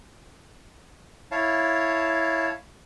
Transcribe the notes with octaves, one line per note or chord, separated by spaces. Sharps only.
E4 C#5 F5 A5